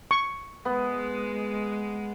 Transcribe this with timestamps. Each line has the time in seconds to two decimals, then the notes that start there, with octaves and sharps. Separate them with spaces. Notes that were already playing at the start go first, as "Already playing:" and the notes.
0.11 C#6
0.65 G#3 B3